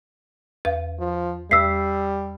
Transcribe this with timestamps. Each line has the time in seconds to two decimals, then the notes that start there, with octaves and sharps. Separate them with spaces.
0.65 E2 B4 F5
1.00 F3
1.51 E2 G3 E6 B6 C7